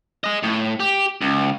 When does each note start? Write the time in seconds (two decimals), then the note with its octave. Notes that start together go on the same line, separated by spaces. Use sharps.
0.24 G#4 D#5
0.43 A2
0.80 G4
1.21 C#2